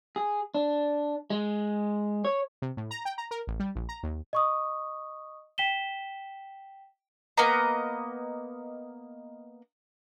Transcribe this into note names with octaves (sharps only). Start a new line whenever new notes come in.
G#4
D4
G#3
C#5
C3
A2
A#5
G5
A#5
A#4
A1
G3
A#1
A#5
D#2
D#5 C#6 D#6
G5 B6 E7 G7
A#3 B3 D#5 A#5